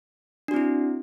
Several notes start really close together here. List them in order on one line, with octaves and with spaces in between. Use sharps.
D4 F#4 C4 E4